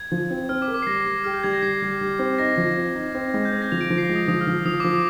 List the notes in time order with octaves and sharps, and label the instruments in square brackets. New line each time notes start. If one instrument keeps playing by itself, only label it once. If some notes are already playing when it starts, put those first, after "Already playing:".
Already playing: [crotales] G#6
[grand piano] F3
C4
[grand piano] C4 [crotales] F6
[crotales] D6
[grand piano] A#4
[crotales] D6
C7
[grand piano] G3 [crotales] A#6
[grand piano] G3
[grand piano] G4 [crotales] F6
[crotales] G6
[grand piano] G3 [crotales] G#6
[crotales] A#6
[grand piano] G3 [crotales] C7
[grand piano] G3
G3
C4
[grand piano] D#4 [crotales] A#6
[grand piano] F3
C4
D#4
C4
G#3
[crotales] G6
[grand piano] C4 [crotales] G#6
[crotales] A#6
[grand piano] F3 [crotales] F7
[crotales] D7
[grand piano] F3
[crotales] C7
A#6
[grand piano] G#3
[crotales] D#6
[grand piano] F3 [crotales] D#6
[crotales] F6
[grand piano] F3
[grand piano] F3 [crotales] D#6
[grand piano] F3 [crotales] D6
[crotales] D#6